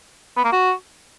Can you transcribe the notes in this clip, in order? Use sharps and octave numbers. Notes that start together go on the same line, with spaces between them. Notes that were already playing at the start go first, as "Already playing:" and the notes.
B3
A#3
F#4